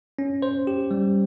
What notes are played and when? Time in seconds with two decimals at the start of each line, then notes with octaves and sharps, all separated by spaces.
0.19 C#4
0.42 C5
0.67 G4
0.91 G3